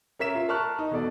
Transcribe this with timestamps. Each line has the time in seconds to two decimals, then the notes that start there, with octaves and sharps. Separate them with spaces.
0.19 C#4 A#4 E5 B6 E7
0.35 F4
0.48 A#4 A5 C#6 F6 F#6
0.79 D#4
0.91 E1 B2 A4 D5